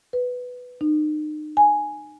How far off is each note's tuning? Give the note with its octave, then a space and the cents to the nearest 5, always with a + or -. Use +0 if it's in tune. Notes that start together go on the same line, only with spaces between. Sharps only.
B4 +5
D#4 -35
G#5 +0